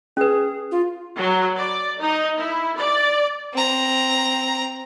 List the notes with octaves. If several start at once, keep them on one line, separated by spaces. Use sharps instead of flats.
C#4 G#4 B4
F4
F#3
D5
D#4
E4
D5
C4 A#5